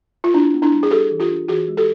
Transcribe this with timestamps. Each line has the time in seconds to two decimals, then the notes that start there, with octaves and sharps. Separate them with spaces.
0.24 F4
0.34 D4 E4
0.54 B3
0.62 D4 E4
0.72 G3
0.83 G#4
0.91 G3 G4 A4
1.11 E3
1.20 F4 G4
1.30 D4
1.48 E3 F#4 G#4
1.68 G#3
1.77 G4 A4